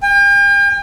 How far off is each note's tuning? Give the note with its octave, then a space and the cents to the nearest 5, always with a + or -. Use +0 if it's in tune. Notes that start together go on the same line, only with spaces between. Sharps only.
G5 +45